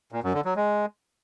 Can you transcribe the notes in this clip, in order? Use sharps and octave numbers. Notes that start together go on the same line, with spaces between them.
A#2
F#2
D3
F#3
G#3